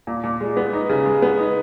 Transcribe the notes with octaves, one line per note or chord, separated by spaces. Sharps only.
A#2
A#2
G#3
B3
D#4
C#3
G#3
B3
D#4